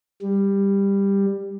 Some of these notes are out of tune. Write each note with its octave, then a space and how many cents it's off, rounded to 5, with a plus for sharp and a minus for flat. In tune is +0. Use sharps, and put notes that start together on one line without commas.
G3 +10